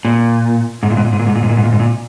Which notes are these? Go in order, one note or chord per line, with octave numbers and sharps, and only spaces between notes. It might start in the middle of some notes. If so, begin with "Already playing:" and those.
A#2
G#2
A#2
G#2
A#2
G#2
A#2
G#2
A#2
G#2
A#2
G#2
A#2
G#2
A#2